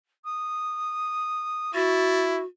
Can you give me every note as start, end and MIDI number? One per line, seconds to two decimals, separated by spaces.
0.25 1.74 87
1.74 2.42 64
1.74 2.45 66
1.74 2.24 93